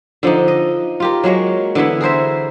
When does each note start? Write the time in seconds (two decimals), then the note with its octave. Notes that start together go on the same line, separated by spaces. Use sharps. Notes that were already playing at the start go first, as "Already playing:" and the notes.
0.23 D3 F3 D4 D#4
0.48 D#5
1.00 F4 G4 A#4
1.24 F#3 G#3 A#3 C#5
1.75 D3 E3 B3 E4
2.01 G#4 A#4 C5 E5